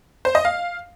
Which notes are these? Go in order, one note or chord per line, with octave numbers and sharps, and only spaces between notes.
C5
D#5
F5